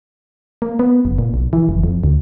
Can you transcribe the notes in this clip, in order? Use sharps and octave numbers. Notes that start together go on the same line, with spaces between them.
A#3
B3
F#1
A#2
B1
E3
F#1
F2
D2